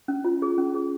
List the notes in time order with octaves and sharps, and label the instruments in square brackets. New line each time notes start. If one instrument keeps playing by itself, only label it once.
[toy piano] C#4
F4
G#4
C#4
G#4